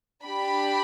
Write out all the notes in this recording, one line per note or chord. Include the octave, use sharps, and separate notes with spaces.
D4 G4 B5